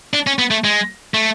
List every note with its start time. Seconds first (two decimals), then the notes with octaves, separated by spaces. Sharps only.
0.13 D4
0.27 C#4
0.39 B3
0.51 A3
0.64 G#3
1.14 A3